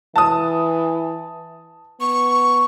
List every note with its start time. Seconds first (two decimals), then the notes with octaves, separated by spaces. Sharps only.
0.16 E3 A5 D#6
2.01 B3 C#6